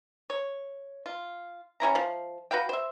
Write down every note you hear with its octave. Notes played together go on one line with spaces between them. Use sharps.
C#5
F4
G3 C#4 E4 A#5
F3 F5
F#4 B4 F5 G5
C5 E5